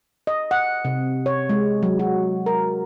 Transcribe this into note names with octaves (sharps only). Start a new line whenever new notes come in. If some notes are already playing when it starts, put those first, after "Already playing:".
D#5
F#5
C3
C#5
G#3
F#3
F#4
A#4